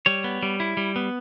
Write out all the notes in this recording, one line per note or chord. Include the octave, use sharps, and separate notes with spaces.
G3 C#5
B3
G3
E4
G3
B3